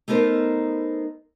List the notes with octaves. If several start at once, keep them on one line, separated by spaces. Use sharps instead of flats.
A3 B3 D#4 A#4 C5